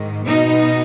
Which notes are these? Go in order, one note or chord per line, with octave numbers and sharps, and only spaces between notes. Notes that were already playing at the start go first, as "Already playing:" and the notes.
Already playing: G#2 D#3
B2 B3 D#4